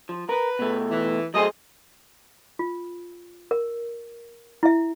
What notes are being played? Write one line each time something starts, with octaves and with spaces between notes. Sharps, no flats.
F3
A#4 B4
B2 A3
E3
F#3 A3 G#4 C5 D#5
F4
A#4
E4 E5